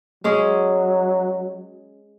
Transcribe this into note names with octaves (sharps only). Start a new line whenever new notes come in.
F#3 G#3 C#4 G#4